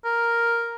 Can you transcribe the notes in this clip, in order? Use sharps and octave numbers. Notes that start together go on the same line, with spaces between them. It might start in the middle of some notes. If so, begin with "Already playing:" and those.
A#4